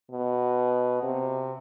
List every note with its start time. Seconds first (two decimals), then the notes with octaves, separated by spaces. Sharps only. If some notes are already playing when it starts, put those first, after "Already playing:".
0.11 B2
1.03 C3